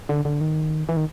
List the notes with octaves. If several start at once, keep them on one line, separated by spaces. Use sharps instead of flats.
D3
D3
D#3
E3
D#3